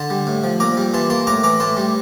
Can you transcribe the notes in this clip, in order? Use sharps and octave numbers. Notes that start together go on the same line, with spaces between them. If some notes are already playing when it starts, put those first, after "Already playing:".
Already playing: D3 A5 C6
G3
A2
F3
A#2 A#5 D6
G3
E3 A5 C6
A#3 A5 C6
A2 A#5 D6
E3 A#5 D6
A2 A5 C6
G3